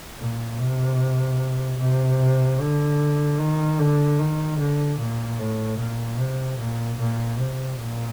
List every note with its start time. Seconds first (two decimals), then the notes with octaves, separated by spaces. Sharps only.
0.19 A#2
0.59 C3
1.78 C3
2.59 D3
3.38 D#3
3.79 D3
4.19 D#3
4.58 D3
4.99 A#2
5.38 A2
5.78 A#2
6.18 C3
6.58 A#2
6.98 A#2
7.38 C3
7.78 A#2